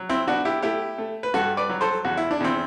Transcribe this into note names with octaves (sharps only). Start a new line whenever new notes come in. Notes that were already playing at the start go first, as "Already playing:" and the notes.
Already playing: F#3
C4 E4
B3 D4 F#4
E4 G4
A3 E4 G4
A3
B4
G2 F#4 A4
B4 D5
F#3
A4 C5
E2 F#4
E4
D4
E2 C4 E4